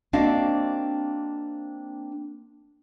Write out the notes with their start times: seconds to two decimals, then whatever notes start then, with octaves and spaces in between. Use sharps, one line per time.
0.13 A#3 C4 D4 F#4 D#5 F5